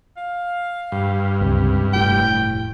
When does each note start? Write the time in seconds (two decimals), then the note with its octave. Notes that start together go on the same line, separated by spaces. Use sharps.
0.17 F5
0.92 G2
1.41 C#2 F#2 C3
1.93 F1 A2 G5